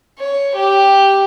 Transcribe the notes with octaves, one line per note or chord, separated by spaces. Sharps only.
C#5
G4